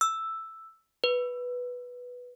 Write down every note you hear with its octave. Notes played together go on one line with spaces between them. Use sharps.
E6
B4